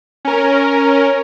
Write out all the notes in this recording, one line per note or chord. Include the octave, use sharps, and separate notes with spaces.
C#4 A#4